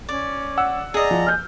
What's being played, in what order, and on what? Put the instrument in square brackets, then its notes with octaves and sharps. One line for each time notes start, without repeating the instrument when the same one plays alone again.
[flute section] C#4 [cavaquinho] D5
[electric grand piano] F#5 E6
[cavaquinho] G#4 D#5 [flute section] D5 A#5
[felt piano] F3
F6 G6